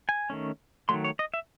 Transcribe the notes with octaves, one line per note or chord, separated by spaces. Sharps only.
G#5
D#3 A3 C#4
D#3 F#3 A3 C6
C#5
D#5
E5